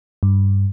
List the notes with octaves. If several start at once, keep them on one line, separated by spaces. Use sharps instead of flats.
G2